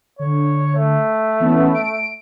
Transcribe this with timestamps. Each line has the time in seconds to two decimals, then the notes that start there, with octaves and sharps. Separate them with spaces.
0.19 D3 C#5
0.76 A3
1.40 E3 B3 C#4
1.74 D7